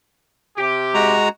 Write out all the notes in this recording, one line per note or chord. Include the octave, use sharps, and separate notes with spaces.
C3 G4
G#3 F#4 A#5